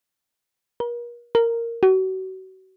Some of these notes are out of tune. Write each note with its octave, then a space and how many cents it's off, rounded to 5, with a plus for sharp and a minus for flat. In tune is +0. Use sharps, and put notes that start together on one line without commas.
A#4 +40
A#4 -10
F#4 +35